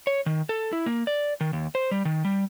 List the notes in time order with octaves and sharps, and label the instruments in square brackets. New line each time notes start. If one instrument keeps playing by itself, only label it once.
[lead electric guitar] C#5
D#3
A4
E4
A#3
D5
D#3
D#2
C5
G3
D#3
G3